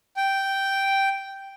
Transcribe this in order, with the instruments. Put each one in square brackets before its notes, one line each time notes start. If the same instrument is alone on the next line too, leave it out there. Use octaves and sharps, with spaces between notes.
[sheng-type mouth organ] G5